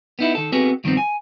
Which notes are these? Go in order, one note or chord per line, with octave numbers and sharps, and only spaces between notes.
B3 D#4 E4
D#3 A4
B3 C4 F#4 G#4 A4 B4
G2 D#3 F3 B3 C4
G#5